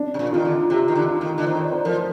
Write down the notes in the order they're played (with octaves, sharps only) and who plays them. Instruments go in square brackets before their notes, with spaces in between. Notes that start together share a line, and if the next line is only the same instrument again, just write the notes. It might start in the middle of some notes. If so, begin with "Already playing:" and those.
Already playing: [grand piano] D4
[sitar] C3
A#2
[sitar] D#3 [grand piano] F4
[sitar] D3
[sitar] C3 [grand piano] G4
[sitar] D#3
D3
[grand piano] F4
[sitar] D#3
D3
[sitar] D#3 [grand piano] C5
[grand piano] D5
C5
[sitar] F3 [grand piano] A#4